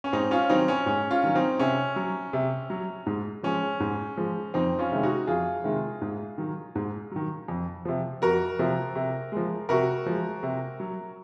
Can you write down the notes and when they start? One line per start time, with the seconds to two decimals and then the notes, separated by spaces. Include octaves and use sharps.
0.04 C#4
0.13 G#2 C4 D#4
0.31 C#4 F4
0.50 D#3 F#3 C4 D#4
0.68 C#4
0.86 G#2 C#4
1.11 C#4 F4
1.23 D#3 F#3
1.35 C4 D#4
1.59 C3 C#4
1.96 F#3
2.33 C3
2.70 F#3
3.07 G#2
3.43 F3 G#3 C#4
3.80 G#2
4.17 F3 G#3
4.54 F2 C4 D#4
4.79 C#4 F4
4.92 C3 D#3 G#3
5.03 D#4 F#4
5.27 F2 F4 G#4
5.64 C3 D#3 G#3
6.02 G#2
6.38 D#3 F#3
6.75 G#2
7.12 D#3 F#3
7.48 F2
7.85 C3 F3
8.22 F2 F#4 A#4
8.59 C3 F3
8.96 C3
9.32 F3 G#3
9.69 C3 F#4 A#4
10.06 F3 G#3
10.43 C3
10.80 F#3